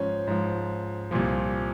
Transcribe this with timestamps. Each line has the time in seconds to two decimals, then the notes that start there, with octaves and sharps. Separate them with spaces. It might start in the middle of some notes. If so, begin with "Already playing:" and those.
Already playing: G#2 F3 C#4
0.27 G#2 F3
1.11 C2 A#2 F3